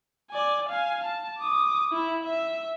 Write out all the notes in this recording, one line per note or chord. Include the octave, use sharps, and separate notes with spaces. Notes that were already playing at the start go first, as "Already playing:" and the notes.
D5 G#5
F5 G#5
A5
D6 D#6
E4 E5
E5